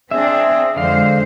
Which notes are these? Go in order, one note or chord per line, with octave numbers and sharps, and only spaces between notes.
C4 D4 G#4 E5
F2 D3 G#3 C5 F5